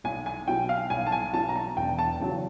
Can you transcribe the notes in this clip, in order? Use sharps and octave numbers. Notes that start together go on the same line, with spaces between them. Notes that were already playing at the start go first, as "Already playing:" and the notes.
B1 G#5
G#5
B2 F#3 G5
F5
B1 G#5
A5
G#5
B2 F#3 A5
A#5
A5
E1 G5
A5
E2 C#3 F#3